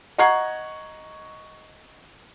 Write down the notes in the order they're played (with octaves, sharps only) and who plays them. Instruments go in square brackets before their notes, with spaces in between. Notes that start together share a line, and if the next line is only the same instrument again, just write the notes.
[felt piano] D#5 F#5 A#5 C#6 G#6 C7